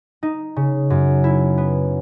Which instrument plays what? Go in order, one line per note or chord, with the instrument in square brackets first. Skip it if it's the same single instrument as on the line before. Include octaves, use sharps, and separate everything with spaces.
[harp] D#4
C#3
F#2
E4
B3